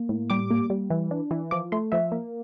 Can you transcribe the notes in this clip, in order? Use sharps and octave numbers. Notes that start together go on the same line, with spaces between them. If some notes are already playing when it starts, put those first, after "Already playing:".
Already playing: A#3
A2
G3 D6
A#3
G3
E3
D4
E3
F3 D6
A3 C6
F3 E5
A#3